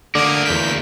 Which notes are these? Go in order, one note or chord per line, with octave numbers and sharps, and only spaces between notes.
D2 D3 A#3 D5 D#6 G#6
E2 G6 B6